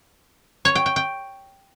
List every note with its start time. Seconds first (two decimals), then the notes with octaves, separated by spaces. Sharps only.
0.65 C#5
0.75 G5
0.86 G5
0.96 G5